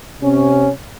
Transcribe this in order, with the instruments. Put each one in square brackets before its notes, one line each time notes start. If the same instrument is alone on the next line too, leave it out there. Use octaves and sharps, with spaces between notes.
[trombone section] C3 C#4